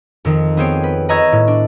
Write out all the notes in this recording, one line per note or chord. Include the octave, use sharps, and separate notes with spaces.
F2 D#3
B3 C4 G#4 C5 C#5 G5
B4
B4 D#5 A#5 C#6 E6 G#6
A2
D4